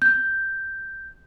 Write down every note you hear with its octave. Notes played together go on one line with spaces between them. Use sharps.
G6